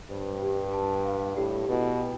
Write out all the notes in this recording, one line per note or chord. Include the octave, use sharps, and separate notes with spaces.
G2 C5
G4
A5
F5
A2 G4
B2 E4
G5